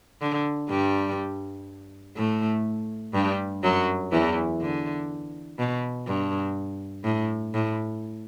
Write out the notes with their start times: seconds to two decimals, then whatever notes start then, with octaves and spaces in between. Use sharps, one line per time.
0.21 D3
0.69 G2 G3
2.16 A2 A3
3.13 G2 G3
3.63 F#2 F#3
4.11 E2 E3
4.61 D3
5.59 B2
6.07 G2
7.04 A2
7.54 A2